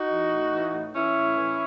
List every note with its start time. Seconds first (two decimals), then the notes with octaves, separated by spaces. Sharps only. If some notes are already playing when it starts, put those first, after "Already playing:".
Already playing: D#4 F#4
0.09 E3
0.30 A2
0.52 E3
0.73 A2
0.95 E3 C#4 E4
1.16 A2
1.37 E3